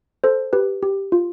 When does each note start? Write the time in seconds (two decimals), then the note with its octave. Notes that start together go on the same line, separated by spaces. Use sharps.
0.24 A4 C5
0.53 G4 B4
0.83 G4
1.12 F4